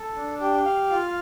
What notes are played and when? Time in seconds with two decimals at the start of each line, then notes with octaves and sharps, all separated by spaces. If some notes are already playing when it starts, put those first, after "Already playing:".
Already playing: A4
0.16 D4
0.40 G4
0.65 F5
0.91 F4